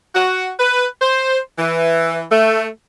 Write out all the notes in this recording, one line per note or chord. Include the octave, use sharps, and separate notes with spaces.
F#4
B4
C5
E3
A3